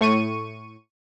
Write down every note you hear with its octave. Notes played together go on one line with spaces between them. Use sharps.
A2 C#6 D#7